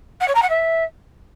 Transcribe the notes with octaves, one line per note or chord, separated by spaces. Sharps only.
F#5
C#5
A#5
F#5
E5